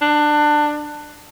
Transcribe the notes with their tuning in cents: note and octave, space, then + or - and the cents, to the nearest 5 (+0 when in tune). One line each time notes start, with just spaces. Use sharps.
D4 +20